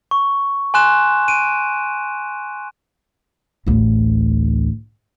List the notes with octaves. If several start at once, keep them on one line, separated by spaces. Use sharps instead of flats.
C#6
G#5 C6 F#6 E7
D7 D#7
A1 D2